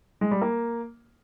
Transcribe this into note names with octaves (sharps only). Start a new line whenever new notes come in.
G#3
G3
A#3